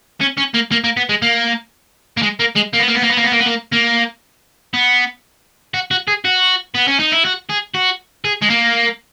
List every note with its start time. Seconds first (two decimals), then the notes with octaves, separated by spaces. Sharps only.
0.21 C#4
0.38 C#4
0.54 A#3
0.72 A#3
0.84 A#3
0.97 B3
1.09 G#3
1.22 A#3
2.17 A#3
2.22 G#3
2.39 A#3
2.55 G#3
2.73 A#3
2.79 B3
2.88 A#3
2.95 B3
3.03 A#3
3.10 B3
3.17 A#3
3.24 B3
3.32 A#3
3.39 B3
3.46 A#3
3.73 A#3
4.74 B3
5.74 F#4
5.91 F#4
6.08 G#4
6.25 F#4
6.75 B3
6.88 C#4
7.00 D#4
7.12 E4
7.25 F#4
7.50 G#4
7.75 F#4
8.25 G#4
8.42 G#3
8.50 A#3